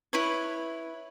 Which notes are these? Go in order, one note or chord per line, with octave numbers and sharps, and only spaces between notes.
E4 B4 C#5